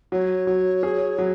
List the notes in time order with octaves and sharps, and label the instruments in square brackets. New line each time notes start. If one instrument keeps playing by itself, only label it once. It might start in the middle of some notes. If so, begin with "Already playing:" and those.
[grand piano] F#3 [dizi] C#5
[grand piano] F#3
G#4
F#3